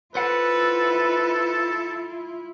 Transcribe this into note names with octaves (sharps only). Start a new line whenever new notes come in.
E4 F4 A4 B4 C5 F#5